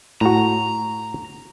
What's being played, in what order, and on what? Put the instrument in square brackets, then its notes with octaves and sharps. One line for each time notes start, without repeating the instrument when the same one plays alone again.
[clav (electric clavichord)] A2 F#4 [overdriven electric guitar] A#5